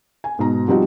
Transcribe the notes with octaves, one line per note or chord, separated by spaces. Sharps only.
G#5
G#2 B2 A#5
F3 G3 C4 D#4 F#4